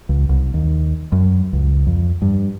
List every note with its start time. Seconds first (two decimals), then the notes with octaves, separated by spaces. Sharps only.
0.09 C#2
0.29 C2
0.54 D#2
1.12 F#2
1.53 C#2
1.87 F2
2.22 G2